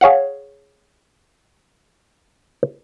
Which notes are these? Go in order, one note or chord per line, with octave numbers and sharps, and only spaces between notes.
G#4 C#5 F5 F#5